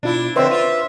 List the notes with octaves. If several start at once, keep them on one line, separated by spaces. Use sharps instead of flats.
B2 D4 E4 F4
F2 D3 C4 B4 C#5 E5 C6
F4